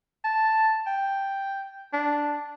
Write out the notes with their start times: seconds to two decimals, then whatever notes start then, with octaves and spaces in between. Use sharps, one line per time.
0.24 A5
0.87 G5
1.93 D4